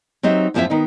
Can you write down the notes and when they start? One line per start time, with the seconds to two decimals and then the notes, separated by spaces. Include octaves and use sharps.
0.23 F#3 C4 D#4 G4 D#5 E5
0.54 F#2 A2 F3 C4 E4 E5
0.70 D#3 B3 D#4